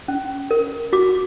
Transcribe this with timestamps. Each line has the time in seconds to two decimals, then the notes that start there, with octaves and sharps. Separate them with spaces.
0.08 C#4
0.51 A#4
0.93 F#4 D6